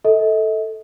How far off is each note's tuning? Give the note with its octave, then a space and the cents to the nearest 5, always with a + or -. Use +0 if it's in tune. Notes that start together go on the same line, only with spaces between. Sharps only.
A4 +0 D#5 +45